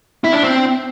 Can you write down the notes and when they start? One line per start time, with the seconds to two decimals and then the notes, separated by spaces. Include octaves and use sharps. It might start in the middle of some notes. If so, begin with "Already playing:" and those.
0.24 E4
0.33 D4
0.43 C4